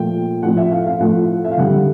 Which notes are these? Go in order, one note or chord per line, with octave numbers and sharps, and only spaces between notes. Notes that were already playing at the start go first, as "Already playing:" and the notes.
Already playing: A#2 F3 A3 G5
A2 F3 A3 F#5
E5
F5
F5
A2 F3 A3 F#5
E5
F5
D3 G3 F#5